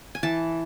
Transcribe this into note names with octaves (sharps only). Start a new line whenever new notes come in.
G#5
E3 A5